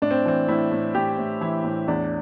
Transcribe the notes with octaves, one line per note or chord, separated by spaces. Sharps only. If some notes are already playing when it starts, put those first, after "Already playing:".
A2 D4
C4
E3 C4
A2 E4
A2
A2 G4
A2
E3 E4
A2
E2 D4